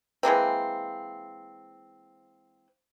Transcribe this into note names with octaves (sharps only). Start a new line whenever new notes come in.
E3 G#3 A#3 C4